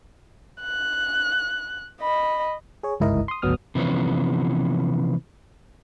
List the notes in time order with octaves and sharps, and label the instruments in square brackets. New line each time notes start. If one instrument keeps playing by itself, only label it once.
[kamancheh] F#6
D#5 B5
[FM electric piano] G#4 C#5
G1 C#2 G#2 E4 A#4 D#5
C6 D#6
G#1 D2 F#3 B3 D#6 F6
[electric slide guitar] C3 E3 F3 B3 C#4